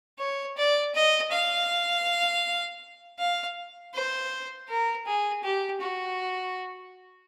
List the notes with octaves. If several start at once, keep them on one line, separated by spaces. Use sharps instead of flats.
C#5
D5
D#5
F5
F5
C5
A#4
G#4
G4
F#4